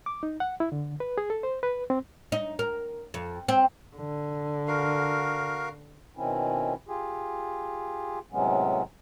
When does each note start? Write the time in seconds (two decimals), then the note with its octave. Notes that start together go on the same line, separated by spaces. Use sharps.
0.06 D6
0.23 D#4
0.40 F#5
0.60 E4
0.72 D3
1.00 B4
1.18 G#4
1.30 A4
1.43 C5
1.63 B4
1.90 C4
2.32 D#4
2.59 A#4
3.14 F2
3.49 C4
3.96 D3
4.68 F#4 A#4 F5
6.16 B2 D#3 C4 C#4 E4
6.88 F4 G4 G#4
8.32 A2 C3 F#3 G#3 B3 C#4